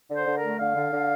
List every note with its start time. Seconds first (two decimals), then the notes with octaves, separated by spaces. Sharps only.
0.09 D3
0.16 C5
0.25 D3
0.37 A#4
0.42 A3
0.59 D3 F5
0.75 D3
0.91 D3